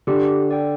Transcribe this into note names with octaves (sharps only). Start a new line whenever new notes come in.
D3 G4
D5 G5